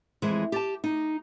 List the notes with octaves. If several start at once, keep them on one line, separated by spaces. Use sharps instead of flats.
F2 E3 G#3 C5
G4 A5
D#4